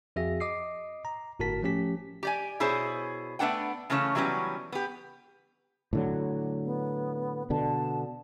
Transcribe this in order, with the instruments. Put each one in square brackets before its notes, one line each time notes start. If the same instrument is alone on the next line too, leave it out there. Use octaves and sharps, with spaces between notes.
[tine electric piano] F2 F#4 G#4 E5 A#6
D#5 D6 D#6 C7
A#5
G1 A2 F#4 A#4 A5 B6
F3 A3 C#4 G4 B6
[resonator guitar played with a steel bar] G4 D5 G#5
B2 E4 G#4 C5 C#5
A3 B3 D4 F#5 G5
C#3 E3 A3 C#4 C#5 A5
E3 F#3 G3 B3 C#4
B3 G4
[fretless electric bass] A2 D3 F#3
[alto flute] B3
[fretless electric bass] B2 D3 [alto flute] A5